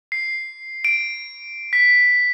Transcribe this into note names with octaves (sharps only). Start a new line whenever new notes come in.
C7
D7
B6